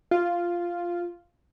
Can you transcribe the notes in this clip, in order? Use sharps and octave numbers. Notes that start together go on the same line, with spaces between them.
F4